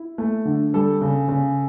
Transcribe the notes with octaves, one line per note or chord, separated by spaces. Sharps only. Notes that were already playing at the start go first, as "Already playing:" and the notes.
Already playing: E4
A3
D3
G3 A4
C#3
C#3